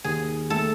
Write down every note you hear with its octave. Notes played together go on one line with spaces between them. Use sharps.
D#2 G#4
A3 A4